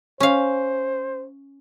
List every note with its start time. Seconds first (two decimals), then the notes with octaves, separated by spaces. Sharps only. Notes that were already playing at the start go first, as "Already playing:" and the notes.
0.20 C#4 C5 F5